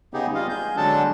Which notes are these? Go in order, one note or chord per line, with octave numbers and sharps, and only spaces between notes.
C#3 B3 D#4 G4 G#4
G3 F4 D#5 F5
G#4 G6
D3 F#3 G#3 D4 A4 A5